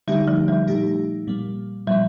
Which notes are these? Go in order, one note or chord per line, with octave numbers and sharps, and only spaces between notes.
D3 G3 A3 D#4 G4
F3
G3
A#2 A3 D#4 G4
A#2 G3 A#3
A#2 F3 G3 A#3